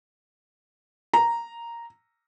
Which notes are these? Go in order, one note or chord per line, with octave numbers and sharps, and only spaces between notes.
A#5